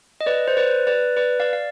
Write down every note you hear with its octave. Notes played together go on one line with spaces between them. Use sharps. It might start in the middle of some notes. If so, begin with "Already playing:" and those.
D#5
B4 D5
C5
B4 D5
B4 D5
B4 D5
D5 F5
F5